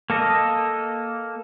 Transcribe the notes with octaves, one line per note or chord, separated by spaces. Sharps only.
A#3 A4 D#5